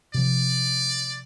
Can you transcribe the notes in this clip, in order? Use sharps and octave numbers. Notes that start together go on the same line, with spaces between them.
C3 F3 D5